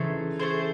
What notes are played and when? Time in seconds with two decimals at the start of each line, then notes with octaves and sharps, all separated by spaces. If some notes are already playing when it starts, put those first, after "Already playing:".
Already playing: C#3 E3 A3 D#4 G#4 C5
0.39 A3 D#4 G#4 C5